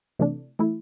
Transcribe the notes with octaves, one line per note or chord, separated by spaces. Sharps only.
C3 E3 A3 D4
E3 A3 E4